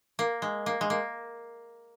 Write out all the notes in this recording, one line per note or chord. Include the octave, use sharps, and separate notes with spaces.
A#3
G#3
A#3
G#3
A#3